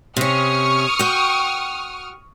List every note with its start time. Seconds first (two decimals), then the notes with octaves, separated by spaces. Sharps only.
0.16 C3 C#4 C#6 D#6 F6
0.99 F#4 G5